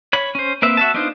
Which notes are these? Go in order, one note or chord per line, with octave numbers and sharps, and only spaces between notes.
C#5 B5
C#4 C5
A#3 C4 B4 E5
F#4 E5 A5
B3 D4 D#4 F4 C5